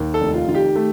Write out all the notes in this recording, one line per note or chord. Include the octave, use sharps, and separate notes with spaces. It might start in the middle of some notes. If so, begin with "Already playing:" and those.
Already playing: D#2
A4
F1
F4
D#3 F4
G4
A3